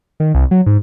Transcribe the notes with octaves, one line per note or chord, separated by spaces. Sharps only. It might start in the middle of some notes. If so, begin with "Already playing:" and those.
D#3
C2
F#3
G#2